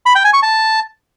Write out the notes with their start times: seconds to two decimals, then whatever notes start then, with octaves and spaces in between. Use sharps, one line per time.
0.06 B5
0.15 G5
0.24 G#5
0.33 C#6
0.43 A5